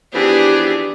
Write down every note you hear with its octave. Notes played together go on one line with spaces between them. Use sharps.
E3 F3 B3 D4 G4 G#4